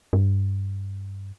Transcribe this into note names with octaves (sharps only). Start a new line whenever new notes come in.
G2